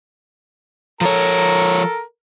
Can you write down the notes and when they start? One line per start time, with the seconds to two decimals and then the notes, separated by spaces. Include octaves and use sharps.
1.01 F3 A4 A#4 C#5